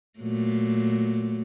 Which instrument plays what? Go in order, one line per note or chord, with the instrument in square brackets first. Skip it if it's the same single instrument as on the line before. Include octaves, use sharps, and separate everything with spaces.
[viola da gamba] A#2 F#3 A3